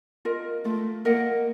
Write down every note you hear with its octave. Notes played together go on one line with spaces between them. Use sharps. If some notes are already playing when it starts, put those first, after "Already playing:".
F4 A#4 D#5
A3 F4
A#3 A#4 D#5 F#5